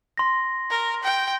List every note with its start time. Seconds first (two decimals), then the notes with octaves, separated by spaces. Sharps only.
0.17 C6 A#6
0.70 A#4
1.03 G5